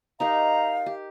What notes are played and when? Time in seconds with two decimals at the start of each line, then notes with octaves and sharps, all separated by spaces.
0.20 D#4 G4 A#4 F5 A#5
0.86 G4